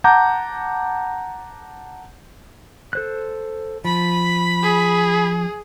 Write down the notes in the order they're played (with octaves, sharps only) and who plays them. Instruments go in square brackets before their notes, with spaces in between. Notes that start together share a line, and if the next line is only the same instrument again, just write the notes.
[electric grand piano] F#5 A5 A#5 D6 G6
[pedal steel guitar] A4 C5 F#6
[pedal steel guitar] F3 [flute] B5
[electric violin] G#4